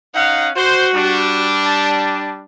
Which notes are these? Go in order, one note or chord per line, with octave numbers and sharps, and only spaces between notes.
C#4 D#4 F5 F#5
F#4 C5
G3 D4
A5